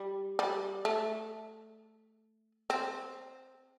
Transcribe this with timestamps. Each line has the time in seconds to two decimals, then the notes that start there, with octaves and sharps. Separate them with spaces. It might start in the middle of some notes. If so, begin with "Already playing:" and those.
Already playing: G3
0.39 G3
0.85 A3
2.70 C4